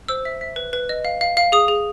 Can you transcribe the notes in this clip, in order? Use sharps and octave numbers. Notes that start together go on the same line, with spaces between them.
C5 E6
E5
E5
B4
B4
D#5
F5
F5
F5
G#4 D#6
G#4